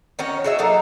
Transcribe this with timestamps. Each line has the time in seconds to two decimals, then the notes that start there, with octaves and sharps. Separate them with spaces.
0.19 D#3 C#4 F#4 C#5
0.44 F#4 G#4 D#5 E5
0.59 F#3 A#3 D#4 A4